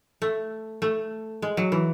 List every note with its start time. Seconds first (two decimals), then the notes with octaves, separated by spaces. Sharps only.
0.22 A3
0.82 A3
1.42 G#3
1.57 F#3
1.72 E3